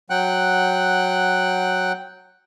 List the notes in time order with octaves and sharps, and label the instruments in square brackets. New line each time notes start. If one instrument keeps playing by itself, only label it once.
[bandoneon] F#3 F#5 G5 F#6